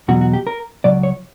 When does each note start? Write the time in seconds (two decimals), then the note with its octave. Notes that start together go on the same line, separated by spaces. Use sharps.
0.08 E2 B2 F#3 F#4
0.21 F#4
0.33 G4
0.47 A#4
0.84 C#2 B2 F#3 D5
1.03 C#5